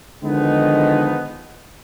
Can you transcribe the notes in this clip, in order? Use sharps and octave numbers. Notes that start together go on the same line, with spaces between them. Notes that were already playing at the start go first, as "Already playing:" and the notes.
D3 D#3 F3 G#3 B3 D#4